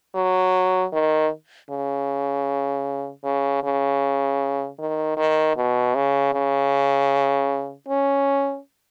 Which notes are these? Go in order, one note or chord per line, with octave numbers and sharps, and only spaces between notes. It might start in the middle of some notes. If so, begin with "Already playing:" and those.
F#3
D#3
C#3
C#3
C#3
D#3
D#3
B2
C#3
C#3
C#4